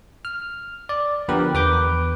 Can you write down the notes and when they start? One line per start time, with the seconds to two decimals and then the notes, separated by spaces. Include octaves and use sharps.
0.25 F6
0.89 D5
1.28 D3 F3 B3 G4 A#4 B4
1.54 E2 B4 D6 G6